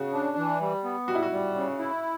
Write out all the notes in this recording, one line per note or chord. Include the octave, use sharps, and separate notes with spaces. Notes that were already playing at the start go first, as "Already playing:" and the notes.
Already playing: C#3 F#4
D4
E3
G3
B3
G3 F#4
E4
F#4
G3
C#3
E4